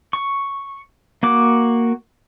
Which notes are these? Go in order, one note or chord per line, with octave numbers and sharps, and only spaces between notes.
C#6
A#3 F#4 D6